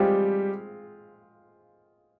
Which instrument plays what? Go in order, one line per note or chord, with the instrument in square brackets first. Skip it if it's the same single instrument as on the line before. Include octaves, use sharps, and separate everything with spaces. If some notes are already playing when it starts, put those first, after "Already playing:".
Already playing: [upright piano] G3 G4 [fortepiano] G#3 C4 F4